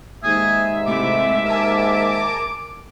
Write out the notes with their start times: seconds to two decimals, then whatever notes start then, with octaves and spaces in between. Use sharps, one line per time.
0.23 D#2 G#2 G#4 E5
0.87 C3 A3 E4 D6
1.46 A#4 G#5 A5